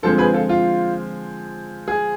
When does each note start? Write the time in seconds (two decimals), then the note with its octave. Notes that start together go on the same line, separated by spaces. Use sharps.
0.02 D3 F3 G#3 C4 A4 C5
0.18 G#4 B4
0.33 F4 A4
0.49 F4
1.88 G#4